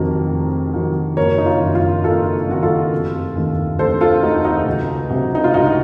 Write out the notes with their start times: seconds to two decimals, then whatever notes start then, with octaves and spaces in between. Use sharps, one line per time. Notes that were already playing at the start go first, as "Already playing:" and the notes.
Already playing: F1 F2 D#3 F#3 A#4
0.30 F1
0.73 F2 D#3 F#3
1.17 F#1 A#4 C#5
1.38 D#4
1.46 F4
1.61 F#2 D#3
1.75 F4
2.04 F#1 F4 A4
2.48 F#2 D#3 F#4
2.63 F4 A4
2.92 F1
3.36 D#2 D#3 A3
3.79 F1 A4 C5
4.01 F4 A4
4.23 D#2 D#3 A3 D#4 F#4
4.44 D#4 F#4
4.66 C#2
5.10 C3 F#3 A3
5.35 D#4
5.44 F4
5.54 C#2 D#4 F#4
5.66 F#4